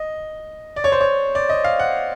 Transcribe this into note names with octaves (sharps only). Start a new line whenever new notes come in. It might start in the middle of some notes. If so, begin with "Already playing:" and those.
Already playing: D#5
D5
C#5
C5
C#5
D5
D#5
F5
F#5